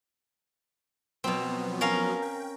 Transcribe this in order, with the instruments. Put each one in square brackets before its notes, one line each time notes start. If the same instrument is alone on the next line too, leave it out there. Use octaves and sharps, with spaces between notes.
[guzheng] B2 C4 [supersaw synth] F3 F#3 B3
[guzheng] C#4 A#4 F5
[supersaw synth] G5